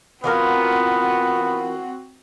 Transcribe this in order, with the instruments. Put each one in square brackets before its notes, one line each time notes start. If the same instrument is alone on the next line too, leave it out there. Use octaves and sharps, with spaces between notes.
[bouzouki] E3 F4 A#4 [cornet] B3 [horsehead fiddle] C4 F#4